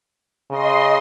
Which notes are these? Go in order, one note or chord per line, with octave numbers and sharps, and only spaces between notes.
C#3 D#5 C6